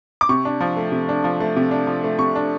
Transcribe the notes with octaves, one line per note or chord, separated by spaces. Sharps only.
D6
C3 C#6
D4
F3
A3
C3
D4
F3
A3
C3
D4
F3
A3
C3 C#6
D4